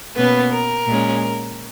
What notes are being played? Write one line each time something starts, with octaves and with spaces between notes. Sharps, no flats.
B2 A#3 B3 C#4 B4
A#4
A#2 G#3 C#4